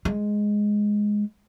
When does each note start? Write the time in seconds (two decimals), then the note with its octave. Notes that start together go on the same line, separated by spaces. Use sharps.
0.05 G#3